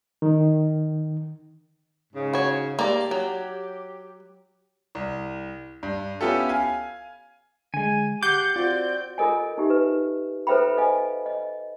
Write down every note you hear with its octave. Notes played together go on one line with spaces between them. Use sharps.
D#3
G#2 C#3
F#4 C#5
A#3 G4 A4 D5
F#3
C2
G2
B3 C#4 E4 F4 G4 A4
F5 G#5
D3 G#3 G#5
G4 F#5 D6 G6 C7
C4 F4 F#4 D5
F4 A4 A#4 D#5 G#5
D#4 G4 E5
B4
A4 B4 C5 E5 G5 B5
A4 D#5 F5 G#5
D#5